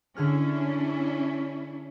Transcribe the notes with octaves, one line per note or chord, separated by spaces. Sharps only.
D3 C#4 D4 E4 G#4 F6